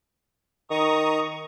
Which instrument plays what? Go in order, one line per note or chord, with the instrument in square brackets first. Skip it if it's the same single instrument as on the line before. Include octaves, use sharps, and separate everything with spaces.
[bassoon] D#3 [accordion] A#5 C#6 D#6